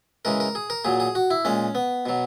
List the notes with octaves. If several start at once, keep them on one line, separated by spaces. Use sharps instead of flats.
C#3 E3 G#3 A#4
A#4
G#4
A#4
A#2 F#3 G#4
G#4
F#4
E4
A#2 G#3 C#4
B3
B2 F#3